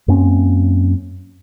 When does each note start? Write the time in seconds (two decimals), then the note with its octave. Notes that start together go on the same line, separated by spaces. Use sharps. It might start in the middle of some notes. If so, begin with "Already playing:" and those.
0.08 F#2 A#3 C4 C#4